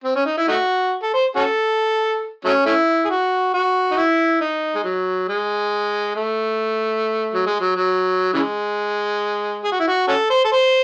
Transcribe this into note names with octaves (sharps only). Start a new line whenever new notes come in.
C4
C#4
D#4
E4
A3 D#4 F#4
A4
C5
C#4 F#4 A4
F#3 A3 C#4
A3 C#4 E4
G#4
F#4
F#4
D#4
E4
D#4
G#3
F#3
G#3
A3
F#3
G#3
F#3
F#3
C#3 E3 G#3
G#4
F#4
E4
F#4
C#4 F#4 A4
C5
A4
C5